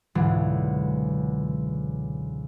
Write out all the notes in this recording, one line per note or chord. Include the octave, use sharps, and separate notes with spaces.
C#2 G#2 B2 D3 E3 F#3